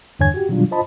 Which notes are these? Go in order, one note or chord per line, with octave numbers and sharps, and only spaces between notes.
E2 G2 D3 C#5 G#5 G#6
F#4 G4
B2 D#3 F#3 G3 D4 F4
F4 C5 D#5 A5 B5